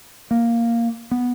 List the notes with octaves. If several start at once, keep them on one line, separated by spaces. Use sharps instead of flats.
A#3
B3